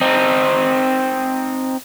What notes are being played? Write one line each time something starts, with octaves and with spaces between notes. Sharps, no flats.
C4 D#4